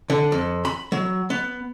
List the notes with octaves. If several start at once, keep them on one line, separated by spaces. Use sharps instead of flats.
D3
F2
B5
F#3
B3